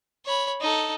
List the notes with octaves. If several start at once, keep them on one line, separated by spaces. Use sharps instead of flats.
C#5 B5
D#4 A4